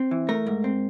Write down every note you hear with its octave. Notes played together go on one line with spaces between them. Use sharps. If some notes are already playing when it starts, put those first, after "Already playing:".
Already playing: C4
E3
A3 A#4
G#2
C4